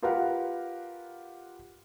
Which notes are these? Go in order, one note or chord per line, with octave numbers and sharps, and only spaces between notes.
F4 G4 A#4 B4 F5 F#5